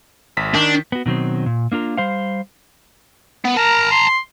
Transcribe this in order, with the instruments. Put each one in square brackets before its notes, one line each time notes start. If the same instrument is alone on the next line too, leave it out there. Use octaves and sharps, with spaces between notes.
[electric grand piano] G#1 B6
[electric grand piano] D#3 [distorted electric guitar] D4
[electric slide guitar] B3 F#4
B2 D#3 F#3 C4
A#2
A#3 D4 F4 A#4
G3 C5 F5
[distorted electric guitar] B3
[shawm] A#4 [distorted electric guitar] A5 A#5
[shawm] C6